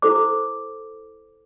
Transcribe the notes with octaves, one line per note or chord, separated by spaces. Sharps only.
E4 A4 C5 D6